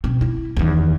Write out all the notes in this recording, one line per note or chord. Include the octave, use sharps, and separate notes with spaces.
B2 C4
E4
E2 D#3